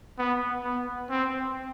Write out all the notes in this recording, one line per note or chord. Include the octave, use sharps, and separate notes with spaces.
B3
B3
C4